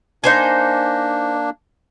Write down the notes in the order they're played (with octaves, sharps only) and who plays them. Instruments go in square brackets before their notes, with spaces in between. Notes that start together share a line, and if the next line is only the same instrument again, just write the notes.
[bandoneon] A#3 D4 [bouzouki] D#4 C5 G#5